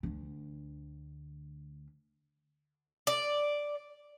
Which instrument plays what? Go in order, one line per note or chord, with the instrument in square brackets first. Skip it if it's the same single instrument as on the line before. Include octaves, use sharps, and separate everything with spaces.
[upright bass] D2 D3
[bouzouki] D5